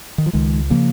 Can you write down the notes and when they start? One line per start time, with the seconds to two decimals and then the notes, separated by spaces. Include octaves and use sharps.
0.18 D#3
0.26 F3
0.33 C#2 D#3 G#3
0.70 C#3 F3 A#3